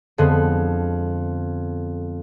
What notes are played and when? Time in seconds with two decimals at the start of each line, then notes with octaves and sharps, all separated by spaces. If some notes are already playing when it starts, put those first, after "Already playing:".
0.18 F2 D3 G#3 B3